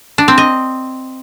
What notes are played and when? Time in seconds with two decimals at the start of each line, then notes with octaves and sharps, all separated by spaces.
0.18 D4
0.28 C4
0.38 D#5